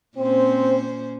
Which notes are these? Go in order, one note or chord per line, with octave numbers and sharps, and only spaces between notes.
A#2 C4 C#4 C5